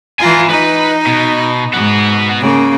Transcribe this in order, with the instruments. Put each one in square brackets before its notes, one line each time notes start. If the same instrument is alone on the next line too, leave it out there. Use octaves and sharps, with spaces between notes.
[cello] E3 F4 [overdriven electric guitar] G#5 A#5
[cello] D#4 [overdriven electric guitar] B4
[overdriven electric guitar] B2
[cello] G#2 [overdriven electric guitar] B3 F#4
[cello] C#3 A#3